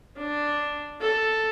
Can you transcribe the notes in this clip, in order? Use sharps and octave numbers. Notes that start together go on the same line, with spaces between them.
D4
A4